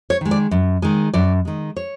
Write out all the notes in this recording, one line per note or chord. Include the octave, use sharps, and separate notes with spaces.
C#5
D#3 G#3
D5
F#2
D#3 G#3
F#2 D5
D#3 G#3
C#5